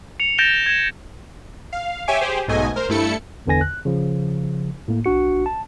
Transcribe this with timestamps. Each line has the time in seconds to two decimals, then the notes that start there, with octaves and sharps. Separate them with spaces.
0.20 C#7 F7
0.38 G6 A6 A#6 D7 E7 G7
0.66 G#6 E7
1.72 F5
2.08 G4 C#5 E5 G#5 D6
2.21 G4 G#4 C5
2.48 B1 G#2 B2 A3 D#5 G#5
2.76 A#4 C5
2.89 G2 A3 E4 A4 C#7
3.46 G#1 E2 D3 B4 G#5 A#6
3.61 F#6
3.85 C#3 F3
4.88 A2 A#3
5.04 B1 D4 F#4 C#7
5.46 A5